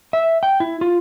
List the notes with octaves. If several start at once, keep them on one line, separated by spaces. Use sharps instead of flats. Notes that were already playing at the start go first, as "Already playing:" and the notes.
E5
G5
E4
F4